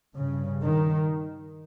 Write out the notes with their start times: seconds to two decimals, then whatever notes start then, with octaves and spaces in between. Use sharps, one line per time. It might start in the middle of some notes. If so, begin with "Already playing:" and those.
0.17 G2 C#3
0.63 D#3